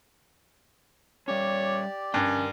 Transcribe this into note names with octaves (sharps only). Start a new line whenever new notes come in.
G3 C#4 G4 C#5 D5
G2 C#4 A#4 G5